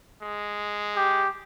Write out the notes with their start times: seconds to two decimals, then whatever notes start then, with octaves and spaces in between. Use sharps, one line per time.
0.22 G#3
0.96 G4